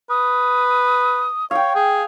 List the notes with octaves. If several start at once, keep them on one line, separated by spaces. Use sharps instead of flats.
B4 D#6
C#5 F5 G5
G#4